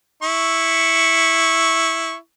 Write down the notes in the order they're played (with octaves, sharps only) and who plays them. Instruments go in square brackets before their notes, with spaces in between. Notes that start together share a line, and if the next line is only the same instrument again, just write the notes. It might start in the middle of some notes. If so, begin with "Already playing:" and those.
[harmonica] E4 C#6